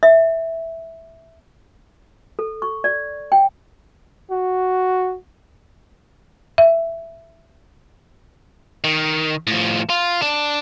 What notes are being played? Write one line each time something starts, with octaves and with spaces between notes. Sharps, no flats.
E5
A4
C#6
D5
G5
F#4
E5
D#3
A2 F3
F4
D4